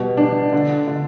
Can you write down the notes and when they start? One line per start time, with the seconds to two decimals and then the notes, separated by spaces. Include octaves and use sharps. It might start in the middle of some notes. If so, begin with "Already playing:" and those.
Already playing: B2 G3
0.17 D4
0.53 D3
0.88 D3